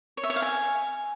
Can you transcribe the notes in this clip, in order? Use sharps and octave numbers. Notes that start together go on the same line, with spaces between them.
C#5
E5
C#5
F5
G#5